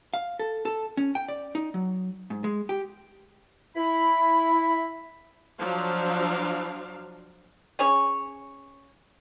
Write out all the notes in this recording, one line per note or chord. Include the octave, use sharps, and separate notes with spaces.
F5
A4
A4
C#4
G5
D5
D#4
F#3
G#2
G#3
G4
E4 B5
F3 F#3 D4 F5
C#4 G#4 C#5